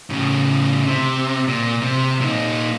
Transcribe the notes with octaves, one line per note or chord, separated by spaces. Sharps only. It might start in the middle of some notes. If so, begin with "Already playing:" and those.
A2 C#3
C3
A#2
C3
A#2 D#4